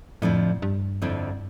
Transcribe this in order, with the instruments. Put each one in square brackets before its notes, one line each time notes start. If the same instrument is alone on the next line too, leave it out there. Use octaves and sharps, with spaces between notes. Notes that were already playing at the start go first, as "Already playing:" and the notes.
[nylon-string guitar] F2 D3 F3 C4 E4 [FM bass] A2
[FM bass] G2
[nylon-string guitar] F2 D3 F3 C4 E4